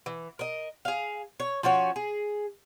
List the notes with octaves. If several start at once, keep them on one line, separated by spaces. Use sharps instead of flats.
E3
A#4 D#5
G#4 F5
C#5
F3 C#4 F#4 C#5
G#4